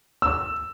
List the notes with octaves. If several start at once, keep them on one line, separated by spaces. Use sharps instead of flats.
E6